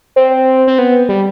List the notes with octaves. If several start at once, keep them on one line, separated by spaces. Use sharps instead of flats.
C4
C4
B3
G3